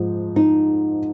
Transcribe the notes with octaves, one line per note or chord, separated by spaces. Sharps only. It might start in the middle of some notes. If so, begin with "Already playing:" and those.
Already playing: G#2 F3
D#4